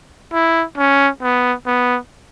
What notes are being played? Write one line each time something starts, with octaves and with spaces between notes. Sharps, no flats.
E4
C#4
B3
B3